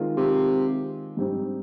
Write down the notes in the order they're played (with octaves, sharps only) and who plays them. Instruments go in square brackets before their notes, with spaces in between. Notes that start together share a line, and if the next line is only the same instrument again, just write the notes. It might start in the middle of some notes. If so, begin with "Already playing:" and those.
Already playing: [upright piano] D#3 G#3 C4 F4 A#4
[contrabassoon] C3
[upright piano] G#2 G3 C4 D#4